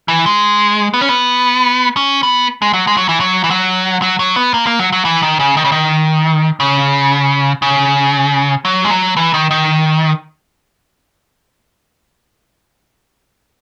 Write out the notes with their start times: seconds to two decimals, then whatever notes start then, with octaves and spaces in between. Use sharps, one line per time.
0.08 E3
0.26 G#3
0.94 B3
1.01 C#4
1.09 B3
1.97 C#4
2.23 B3
2.62 G#3
2.73 F#3
2.87 G#3
2.97 F#3
3.09 E3
3.20 F#3
3.44 E3
3.50 F#3
4.02 F#3
4.19 F#3
4.36 B3
4.54 A#3
4.67 A#3
4.80 F#3
4.92 F#3
5.05 E3
5.22 D#3
5.40 C#3
5.57 D#3
5.65 C#3
5.72 D#3
6.60 C#3
7.62 C#3
8.65 F#3
8.85 G#3
8.90 F#3
9.17 E3
9.34 D#3
9.51 D#3